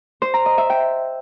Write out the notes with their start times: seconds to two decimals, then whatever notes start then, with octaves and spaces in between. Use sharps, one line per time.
0.22 C5
0.34 A#5
0.46 D#5
0.58 E5
0.70 G5